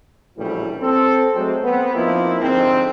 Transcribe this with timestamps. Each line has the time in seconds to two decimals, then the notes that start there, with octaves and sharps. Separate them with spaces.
0.38 A#1 A2 C#3 E3 F#3 G3
0.81 C4 A4
1.33 F#3 G#3 A3 C4
1.63 B3 C4
1.94 F3 A#3 C4 D#4 E4
2.40 F2 G#2 D3 C4